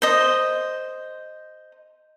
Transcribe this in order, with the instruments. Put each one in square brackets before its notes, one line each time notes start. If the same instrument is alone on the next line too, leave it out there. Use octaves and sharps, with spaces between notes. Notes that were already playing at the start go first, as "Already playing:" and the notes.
[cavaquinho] C5 D#5